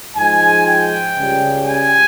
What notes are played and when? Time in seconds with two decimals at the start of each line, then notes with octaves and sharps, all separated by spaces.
0.17 G#2 F3 G#3 G#5
0.67 G5
1.17 C#2 C#3 G3
1.67 G#5